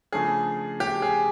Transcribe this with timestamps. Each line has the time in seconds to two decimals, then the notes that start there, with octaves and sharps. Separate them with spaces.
0.12 C#3 F3 A3 D4 G#4
0.80 G4
1.02 G#4